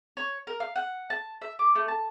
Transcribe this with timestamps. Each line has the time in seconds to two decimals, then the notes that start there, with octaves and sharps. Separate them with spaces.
0.17 C#5
0.47 A#4
0.60 F5
0.76 F#5
1.10 A5
1.42 E5
1.59 D6
1.75 A3
1.88 A5